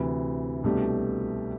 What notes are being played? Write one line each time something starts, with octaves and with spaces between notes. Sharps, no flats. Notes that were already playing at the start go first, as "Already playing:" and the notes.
Already playing: D2 C3 E3
C2 B2 A3 D4 G4